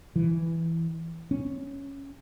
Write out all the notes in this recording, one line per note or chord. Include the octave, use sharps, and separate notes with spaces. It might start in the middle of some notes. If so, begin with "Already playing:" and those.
E3
C#4